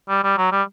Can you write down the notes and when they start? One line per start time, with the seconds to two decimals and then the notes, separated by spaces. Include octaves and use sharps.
0.09 G3
0.24 G3
0.38 F#3
0.52 G3